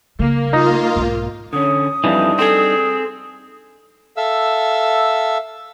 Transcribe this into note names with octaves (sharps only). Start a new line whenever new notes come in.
C#3 G3 A#3
D#4 F4 D#5
B1 G#2
D3 C#4 D#6
F2 E3 G3 D4 D#4
C4 G#4 A4
A4 E5 F5 E6